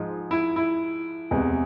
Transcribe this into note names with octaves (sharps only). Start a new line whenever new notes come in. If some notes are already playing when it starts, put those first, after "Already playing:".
Already playing: G#2 F3 G#3
E4
E4
E2 C3 E3 G#3